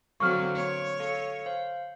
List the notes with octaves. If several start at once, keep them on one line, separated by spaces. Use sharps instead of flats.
D3 F#3 C4 F5 C#6 F6
A#3 C#5 D7
A4 F5 C#7
C5 F5